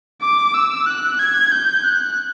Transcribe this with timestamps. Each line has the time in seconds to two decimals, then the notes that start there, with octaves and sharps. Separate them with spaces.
0.22 D6
0.54 E6
0.87 F#6
1.19 G#6
1.52 G6
1.84 F#6